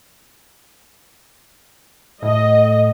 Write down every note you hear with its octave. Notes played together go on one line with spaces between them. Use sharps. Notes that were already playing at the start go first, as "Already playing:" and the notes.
A2 D#5